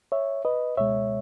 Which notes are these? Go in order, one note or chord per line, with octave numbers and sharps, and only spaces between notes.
C#5 E5
B4 D#5
C#2 B2 G#3 C#5 E5